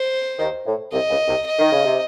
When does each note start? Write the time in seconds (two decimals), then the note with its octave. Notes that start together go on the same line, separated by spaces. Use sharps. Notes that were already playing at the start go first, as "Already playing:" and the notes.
Already playing: C5
0.39 D#2 D#3
0.66 A2
0.92 C2 C3 D#5
1.10 C#2 C#3
1.28 C2 C3
1.46 D#5
1.59 D#3
1.72 C#3
1.85 C3